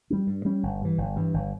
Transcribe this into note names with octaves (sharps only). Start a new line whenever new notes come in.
G3 C#4
G2
G3 C#4
G1
G2 E3
G1
G2 E3
G1